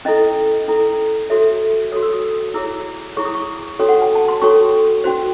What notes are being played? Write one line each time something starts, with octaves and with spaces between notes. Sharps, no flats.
C#4 E4 A4 D#5
C#4 E4 A4
F#4 A4 C#5 E5
F#4 A4 C#5 D#6
E6
D#6
E4 G#4 C#5 E6
E4 G#4 C#5 C#6
D#6
C#6
C#4 F#4 A4 C#5
F#5
G#5
A5
C6
C#4 F#4 A4 C#5 C#6
C#4 F#4 C5